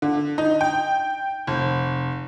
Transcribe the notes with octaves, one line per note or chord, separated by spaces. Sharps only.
D3
D#4
G5
F1